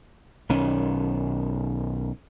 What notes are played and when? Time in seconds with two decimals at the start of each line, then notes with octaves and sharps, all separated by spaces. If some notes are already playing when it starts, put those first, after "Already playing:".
0.49 B1 D#3 C#4